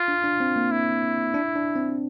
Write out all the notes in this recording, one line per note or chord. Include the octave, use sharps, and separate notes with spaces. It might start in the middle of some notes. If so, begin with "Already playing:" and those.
Already playing: F4
D4
D4
C4
A#3
E4
D4
D4
C4